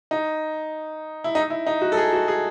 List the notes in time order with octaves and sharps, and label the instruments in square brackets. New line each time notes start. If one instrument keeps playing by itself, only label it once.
[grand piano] D#4
E4
D#4
E4
D#4
F#4
A4
G#4
F#4
G#4